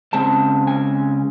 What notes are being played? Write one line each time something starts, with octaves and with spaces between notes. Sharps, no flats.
C#3 G#3 C4 A5
G#5